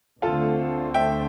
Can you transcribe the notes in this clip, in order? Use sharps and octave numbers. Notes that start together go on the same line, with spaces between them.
D2 D3 A3 C4 F4 A4
E5 G5